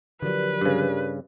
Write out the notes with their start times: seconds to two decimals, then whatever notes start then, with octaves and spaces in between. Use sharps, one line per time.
0.22 D3 F3 F#3 G4 A#4 B4 D5
0.61 G2 C#3